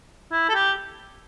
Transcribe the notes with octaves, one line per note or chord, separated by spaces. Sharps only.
E4
A4
G4